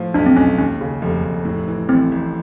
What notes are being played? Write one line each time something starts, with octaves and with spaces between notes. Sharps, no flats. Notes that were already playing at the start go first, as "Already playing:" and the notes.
Already playing: A2 F3
B1 D4
C4
B1 C#4
D#2 C#4
C#3
F1
F1
A2
E3
A1 C4
A1